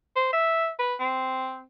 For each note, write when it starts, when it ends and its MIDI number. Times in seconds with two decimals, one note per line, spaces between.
0.16 0.30 72
0.33 0.69 76
0.79 0.94 71
1.00 1.62 60